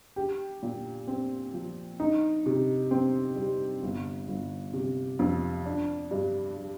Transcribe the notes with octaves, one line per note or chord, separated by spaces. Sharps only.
G4
A#2
C4
F3
D#4
C3
C4
G3
G1
G1
C3
F2
D4
G2
G3